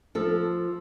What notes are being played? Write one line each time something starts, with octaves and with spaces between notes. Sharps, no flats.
F3 A4